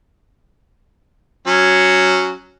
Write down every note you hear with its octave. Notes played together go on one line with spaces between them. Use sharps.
F#3 C#4